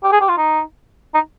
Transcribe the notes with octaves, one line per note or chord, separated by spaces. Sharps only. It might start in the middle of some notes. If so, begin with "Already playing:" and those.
G4
G#4
G4
F4
D#4
D#4